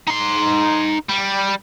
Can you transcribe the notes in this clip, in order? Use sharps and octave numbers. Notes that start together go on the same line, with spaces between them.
D#4 C6
G3